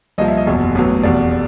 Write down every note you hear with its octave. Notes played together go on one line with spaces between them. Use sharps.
C2 A#2 F3 D#5
E5
D#5
F#1 E2 B2
A1 A2 F#3 B3
F1 E2 B2 D5